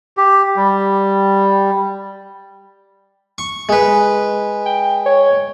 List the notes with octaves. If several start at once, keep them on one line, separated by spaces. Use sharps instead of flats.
G4
G3
C#6
G#3 B4
G5
C#5